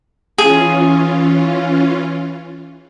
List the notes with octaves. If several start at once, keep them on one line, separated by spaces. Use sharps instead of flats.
E3 C#4 F4 G#4